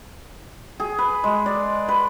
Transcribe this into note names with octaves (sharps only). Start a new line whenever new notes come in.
G#4
B4
G#3
D5
B4